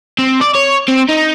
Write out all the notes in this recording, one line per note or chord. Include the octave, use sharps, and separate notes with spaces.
C4
D5
C#5
C4
D#4